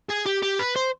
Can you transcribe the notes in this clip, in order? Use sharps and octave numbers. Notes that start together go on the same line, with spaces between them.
G#4
G4
G4
B4
C5